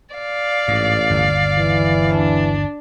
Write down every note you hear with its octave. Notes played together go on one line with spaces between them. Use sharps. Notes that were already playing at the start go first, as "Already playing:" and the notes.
D5 F5
A1 G#2
G1 D#2
E3
D4